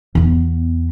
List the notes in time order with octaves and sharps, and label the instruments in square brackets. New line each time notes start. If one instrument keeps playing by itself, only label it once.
[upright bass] E2 B3